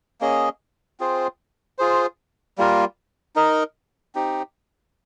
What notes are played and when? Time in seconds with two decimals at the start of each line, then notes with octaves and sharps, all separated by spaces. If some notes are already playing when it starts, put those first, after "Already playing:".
0.21 A#3 C#4 G#4 D#5
1.00 C4 F4 G#4 C5
1.78 F4 G#4 C5
2.58 G3 A#3 F4 A#4
3.36 D#4 A#4 D#5
4.15 C4 D#4 G4